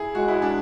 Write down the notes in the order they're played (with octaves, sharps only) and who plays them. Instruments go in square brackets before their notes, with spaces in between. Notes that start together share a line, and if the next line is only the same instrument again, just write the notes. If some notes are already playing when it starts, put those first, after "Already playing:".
Already playing: [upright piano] E4 G#4
[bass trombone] G#3 [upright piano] F#4
[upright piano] E4
D4